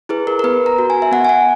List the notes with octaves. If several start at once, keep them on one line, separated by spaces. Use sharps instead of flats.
E4 G#4 B4
A#4
A#4
B3 B4
A#5
F#4
G#5
E5
B3 F#5
G#5
F#5